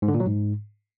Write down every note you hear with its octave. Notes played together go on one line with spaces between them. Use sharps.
G#2
D3
A#2
F#3
G#2